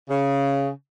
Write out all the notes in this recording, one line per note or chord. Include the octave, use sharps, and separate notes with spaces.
C#3